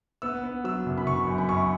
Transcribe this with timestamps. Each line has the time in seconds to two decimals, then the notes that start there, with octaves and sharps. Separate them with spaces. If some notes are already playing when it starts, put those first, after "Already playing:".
0.22 B3 E6
0.44 B3
0.64 F#3 E6
0.86 F#1
0.98 B5
1.06 F#1 C#6
1.27 F#2
1.38 B5
1.49 F#2 C#6